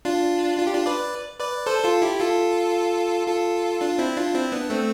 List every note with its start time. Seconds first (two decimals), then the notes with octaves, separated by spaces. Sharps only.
0.05 D4 F4
0.59 F4
0.67 G4
0.74 D4 F4
0.86 B4 D5
1.40 B4 D5
1.66 A4 C5
1.84 F4 A4
2.02 E4 G4
2.20 F4 A4
3.27 F4 A4
3.81 D4 F4
3.98 C4 E4
4.17 D4 F4
4.35 C4 E4
4.52 B3 D4
4.70 A3 C4